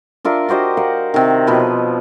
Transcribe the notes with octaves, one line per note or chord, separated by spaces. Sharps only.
D4 F4 A#4 E5
F#4 G4 C5 D#5
A#4 D#5 F5 F#5
C3 D#3
B2 F3 B4